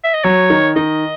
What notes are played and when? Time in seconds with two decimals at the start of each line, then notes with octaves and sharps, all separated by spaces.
0.04 E5
0.14 D#5
0.24 F#3 C#5
0.50 D#3
0.76 D#3 D#5